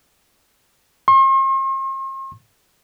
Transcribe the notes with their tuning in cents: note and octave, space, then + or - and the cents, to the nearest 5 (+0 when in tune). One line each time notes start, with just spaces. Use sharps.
C6 +45